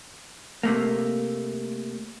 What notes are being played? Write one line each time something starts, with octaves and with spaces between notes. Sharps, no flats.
C3 A3 A#3